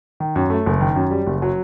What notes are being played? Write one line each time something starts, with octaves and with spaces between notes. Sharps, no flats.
D#3
F#2
A3
F#1
D#3
F#2
G3
F#1
F#3